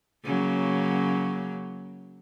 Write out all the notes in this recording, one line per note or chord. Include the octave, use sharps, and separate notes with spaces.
C#3 F#3 A#3